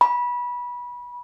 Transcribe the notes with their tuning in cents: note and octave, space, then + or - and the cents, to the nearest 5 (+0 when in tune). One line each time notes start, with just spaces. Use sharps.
B5 -20